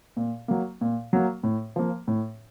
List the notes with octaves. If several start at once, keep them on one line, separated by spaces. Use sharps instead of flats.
A#2
F#3 A#3
A#2
F#3 A#3
A2
F3 A#3
A2